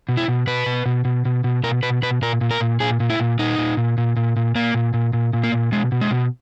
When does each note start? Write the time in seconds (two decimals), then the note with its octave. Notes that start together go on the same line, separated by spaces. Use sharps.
0.09 B2
0.17 E4
0.28 B2
0.47 B2 B4
0.66 B2
0.86 B2
1.05 B2
1.25 B2
1.44 B2
1.63 B2 A#4
1.83 B2 B4
2.02 B2 B4
2.22 A#2 A#4
2.41 A#2
2.51 A#4
2.60 A#2
2.80 A#2 G#4
3.00 A#2
3.10 E4
3.19 A#2
3.39 A#2 D#4
3.58 A#2
3.77 A#2
3.98 A#2
4.16 A#2
4.36 A#2
4.55 A#2 A#3
4.74 A#2
4.94 A#2
5.13 A#2
5.33 A#2
5.44 A#3
5.52 A#2
5.72 B2 G#3
5.92 B2
6.01 G#3
6.10 B2